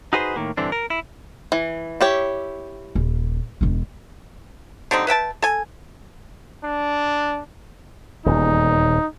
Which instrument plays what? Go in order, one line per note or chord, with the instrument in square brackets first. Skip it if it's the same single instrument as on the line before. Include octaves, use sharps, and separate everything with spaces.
[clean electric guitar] D#4 F#4 G#4 B4 C5
A2 D#3 A#3
G2 D3 E3 C4 D4
A#4
E4
[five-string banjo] E3
E4 G4 C#5
[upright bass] D#1
E1 D4
[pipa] D3 G3 C4 D#4
B4 E5 G5 A5
A4 G#5
[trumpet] D4
[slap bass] D#1 E2 [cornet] D#4